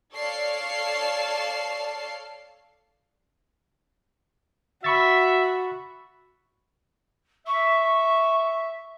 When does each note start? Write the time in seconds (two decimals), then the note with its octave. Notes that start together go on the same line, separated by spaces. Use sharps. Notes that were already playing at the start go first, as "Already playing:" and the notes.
0.14 A4 C#5 D5 F5 A5 C7
4.84 F#4 E5 B5 C#6 A6
7.47 E5 C#6